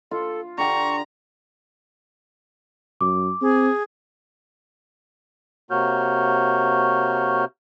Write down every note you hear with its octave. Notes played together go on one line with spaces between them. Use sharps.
F4 A4
D3 G4 A#5 C#6 D6
F#2 D6
C4 G#4
C3 A#3 F#4 C#5 F6 G6